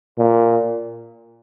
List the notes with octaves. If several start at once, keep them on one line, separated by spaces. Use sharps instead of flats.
A#2